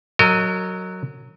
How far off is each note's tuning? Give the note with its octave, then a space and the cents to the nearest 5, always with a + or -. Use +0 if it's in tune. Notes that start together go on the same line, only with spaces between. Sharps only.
F#3 +0 A#4 -40 D#5 +0